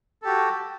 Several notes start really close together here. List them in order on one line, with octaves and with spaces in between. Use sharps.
A4 G4 F#4